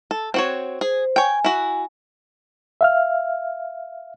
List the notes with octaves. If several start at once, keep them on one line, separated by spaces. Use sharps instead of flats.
A4
C4 F#4 C#5
G#4 C5
C#5 G5 G#5
E4 F#4
E5 F5 F6